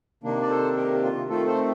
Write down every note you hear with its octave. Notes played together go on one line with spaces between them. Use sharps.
C3 D#3 A#3 D4
D5
A4 C5
G4 A#4
G4
F4
D#3 A3 C4 F4 A4
A4 C5